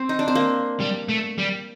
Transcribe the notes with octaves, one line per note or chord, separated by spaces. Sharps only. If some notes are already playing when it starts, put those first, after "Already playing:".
Already playing: C4
D#4
D4
C4
A#3
G3
A3
G3